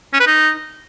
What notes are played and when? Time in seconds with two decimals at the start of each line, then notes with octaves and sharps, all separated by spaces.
0.13 C#4
0.20 B4
0.27 D#4